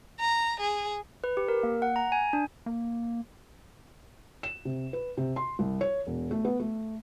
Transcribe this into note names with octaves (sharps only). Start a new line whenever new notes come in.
A#5
G#4
B4
G4
A#4
A#3
F#5
A#5
G#5
D4
A#3
E7
C3
B4
C3
C6
C2
C#5
E1
A3
B3
A3